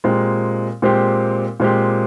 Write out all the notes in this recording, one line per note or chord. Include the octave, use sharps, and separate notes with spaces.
A#2 G#3 C4 G4
A#2 G#3 C4 G4
A#2 G#3 C4 G4